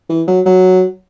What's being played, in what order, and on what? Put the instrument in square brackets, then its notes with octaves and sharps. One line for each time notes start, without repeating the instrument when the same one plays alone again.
[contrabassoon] E3
F#3
F#3